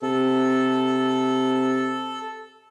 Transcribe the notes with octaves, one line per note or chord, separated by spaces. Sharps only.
C3 A4